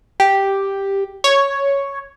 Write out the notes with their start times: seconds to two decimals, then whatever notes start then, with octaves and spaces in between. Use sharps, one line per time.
0.20 G4
1.24 C#5